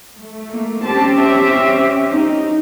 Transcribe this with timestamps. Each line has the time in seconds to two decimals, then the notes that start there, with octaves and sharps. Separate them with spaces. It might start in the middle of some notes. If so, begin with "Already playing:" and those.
0.17 A3
0.49 A#3
0.85 C4 C#4 G4 A5
1.19 E5
2.11 D#4